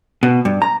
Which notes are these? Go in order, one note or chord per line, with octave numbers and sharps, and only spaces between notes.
B2
G2
A#5